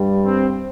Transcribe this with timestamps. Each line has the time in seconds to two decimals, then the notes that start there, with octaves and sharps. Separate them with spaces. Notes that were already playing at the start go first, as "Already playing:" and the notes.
Already playing: G2 G3
0.23 C4